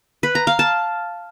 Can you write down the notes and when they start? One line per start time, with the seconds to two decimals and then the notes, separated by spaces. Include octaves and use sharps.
0.23 B4
0.35 A#5
0.47 F5
0.59 A5